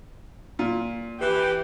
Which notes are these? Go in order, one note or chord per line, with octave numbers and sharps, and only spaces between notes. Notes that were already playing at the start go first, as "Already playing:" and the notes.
A#2
E3 G4